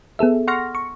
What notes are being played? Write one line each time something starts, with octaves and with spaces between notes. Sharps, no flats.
B3 G#4 A4 E5
F#5 C6 C#6 F6 A#6
C#6